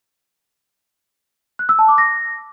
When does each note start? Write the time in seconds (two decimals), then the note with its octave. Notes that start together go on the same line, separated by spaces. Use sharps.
1.59 F#6
1.69 E6
1.79 A5
1.88 D6
1.98 A#6